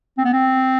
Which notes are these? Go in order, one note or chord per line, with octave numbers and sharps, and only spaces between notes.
C4
B3
C4